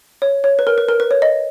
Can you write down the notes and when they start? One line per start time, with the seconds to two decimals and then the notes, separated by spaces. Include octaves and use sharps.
0.22 C#5
0.44 C#5
0.59 B4
0.67 A#4
0.78 B4
0.89 A#4
1.00 B4
1.11 C#5
1.22 D#5